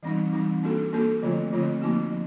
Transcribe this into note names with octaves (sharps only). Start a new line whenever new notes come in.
E3 G3 C4 D#4
E3 G3 C4 D#4
A#3 D4 F#4 A4
A#3 D4 F#4 A4
D3 F3 A3 C4 F4
D3 F3 A3 C4 F4
F3 A#3 D#4 F#4
F3